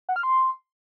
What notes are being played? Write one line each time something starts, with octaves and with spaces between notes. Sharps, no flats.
F#5
F6
C6